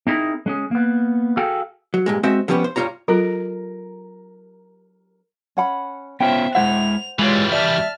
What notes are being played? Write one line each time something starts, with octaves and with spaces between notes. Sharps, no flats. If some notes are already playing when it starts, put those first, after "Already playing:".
C4 D#4 E4 G#4 A#4
G#3 C#4 G#4
A#3 B3
F#4 G#4 A4 F5 G5
F#3
G2 A#2 G#3
G#3 C4 F#4 C5 D#5 E5
D3 F3 G3 B3 C#4 G4
C5
G2 G3 F4 C#5 A#5
F#3 F4 A4 A#4
C#4 F#5 B5
B3 C#4 F4 C5 E5 G5
G#3 E4 C5 E5 F#5 F7
E3 G3 G#3 F4 G#4 C#5
D5 E5 A5 F6